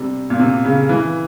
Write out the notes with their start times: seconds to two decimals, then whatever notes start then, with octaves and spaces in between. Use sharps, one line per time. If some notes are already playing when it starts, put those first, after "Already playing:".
Already playing: C3 G3
0.30 A#2
0.39 C3
0.65 C#3
0.89 E3